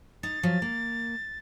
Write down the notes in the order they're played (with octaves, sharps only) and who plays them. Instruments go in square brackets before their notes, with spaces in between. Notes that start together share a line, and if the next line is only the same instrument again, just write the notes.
[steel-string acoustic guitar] D#4 [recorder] A6
[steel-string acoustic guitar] F3 F#3
A#3